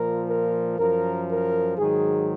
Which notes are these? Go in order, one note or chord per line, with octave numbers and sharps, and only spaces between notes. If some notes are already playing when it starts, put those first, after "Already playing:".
Already playing: A#2 F3 A#4
A#4
F#2 F3 A#4
A#4
G#2 D#3 F#3 G#4